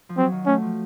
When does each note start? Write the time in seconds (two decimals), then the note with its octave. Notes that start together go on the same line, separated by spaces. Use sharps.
0.09 F3
0.17 F#3 C4
0.32 D#3
0.46 A3 C#4
0.62 F3